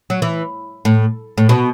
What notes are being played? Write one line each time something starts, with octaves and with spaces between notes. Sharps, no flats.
F#3
E3
A2
A2
B2